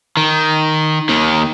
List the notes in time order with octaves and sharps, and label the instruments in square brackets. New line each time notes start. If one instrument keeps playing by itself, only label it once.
[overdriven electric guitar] D#3
D#2 D#3